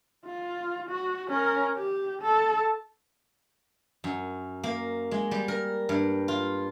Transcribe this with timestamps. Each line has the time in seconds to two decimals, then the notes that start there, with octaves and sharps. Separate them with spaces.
0.26 F4
0.90 F#4
1.29 C#4 A#4
1.77 G4
2.22 A4
4.04 F#2
4.64 A#3
5.11 G#3
5.31 G3
5.48 A#4
5.89 G2
6.28 F4